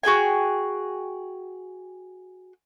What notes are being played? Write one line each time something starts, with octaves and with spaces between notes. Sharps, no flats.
F#4 G#4 G5 G#5